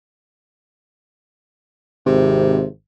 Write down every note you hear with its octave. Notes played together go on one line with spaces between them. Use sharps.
G#1 C3